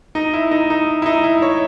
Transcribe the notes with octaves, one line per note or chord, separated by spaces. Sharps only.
D#4
E4
D#4
D#4
E4
D#4
E4
C#5